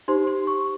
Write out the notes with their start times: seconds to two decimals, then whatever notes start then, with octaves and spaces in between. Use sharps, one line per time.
0.08 D#4 G4 C5 C6
0.27 C6
0.47 C#6